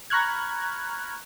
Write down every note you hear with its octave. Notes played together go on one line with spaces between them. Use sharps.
A#5 B5 C#6 F6 F#6 G#6